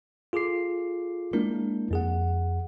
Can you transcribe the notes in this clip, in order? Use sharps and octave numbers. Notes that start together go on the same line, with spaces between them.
F4 G#4 A4 D6 C7
G#3 A#3 D4 E4 A#4
F2 G#4 F#5